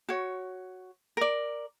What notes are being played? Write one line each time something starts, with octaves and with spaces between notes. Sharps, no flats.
F#4 C#5
A#4 D5